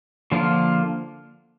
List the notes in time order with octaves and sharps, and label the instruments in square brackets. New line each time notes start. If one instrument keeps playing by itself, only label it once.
[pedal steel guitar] D3 F3 A#3 F4